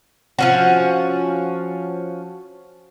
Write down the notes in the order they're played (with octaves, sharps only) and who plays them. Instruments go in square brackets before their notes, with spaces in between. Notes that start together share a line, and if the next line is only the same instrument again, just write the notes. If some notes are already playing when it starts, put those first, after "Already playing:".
[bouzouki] F3 C#4 F#4